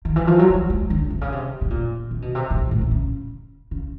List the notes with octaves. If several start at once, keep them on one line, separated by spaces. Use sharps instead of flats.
D#3
E3
F3
F#3
G3
G#3
D3
C3
C#3
C3
B2
A#2
C3
B2
C3
B2
A#2
A2
C3
C#3
C#3